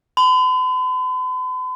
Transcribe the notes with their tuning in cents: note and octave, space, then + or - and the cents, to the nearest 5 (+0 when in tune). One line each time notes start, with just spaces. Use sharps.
B5 +45